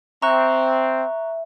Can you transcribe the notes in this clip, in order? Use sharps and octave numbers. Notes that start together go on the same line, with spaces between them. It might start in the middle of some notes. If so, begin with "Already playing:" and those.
C4 E5 A#5 C#6 F#6